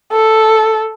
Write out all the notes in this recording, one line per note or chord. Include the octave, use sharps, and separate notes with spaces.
A4